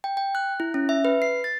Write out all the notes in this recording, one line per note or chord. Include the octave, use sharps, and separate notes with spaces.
G5
G5
F#6
E4
C#4
E5
B4
C7
A6